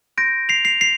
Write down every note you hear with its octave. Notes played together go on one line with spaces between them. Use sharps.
C6 G6 A#6 D7
C7 F7
C7 F7
C7 F7